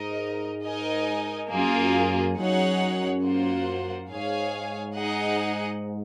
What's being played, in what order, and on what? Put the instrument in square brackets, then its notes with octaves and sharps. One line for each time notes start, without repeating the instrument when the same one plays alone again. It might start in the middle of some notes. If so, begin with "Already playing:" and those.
Already playing: [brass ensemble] G#2 [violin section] D#4 A#4 D#5
[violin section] D#4 A#4 D#5 G#5
[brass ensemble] F#2 [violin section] A#3 F4 G#4
[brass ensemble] F#2 [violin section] D#4 G#4 C#5 F#5
[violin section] A#3 F4 C5 F#5
[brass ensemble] G#2 [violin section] G#4 C#5 F5 G#5
[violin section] D#4 G#4 D#5 F#5